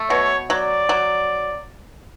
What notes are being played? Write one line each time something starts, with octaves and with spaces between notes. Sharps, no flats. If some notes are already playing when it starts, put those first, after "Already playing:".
Already playing: A3
B2 C#5
F#3 D5
F#3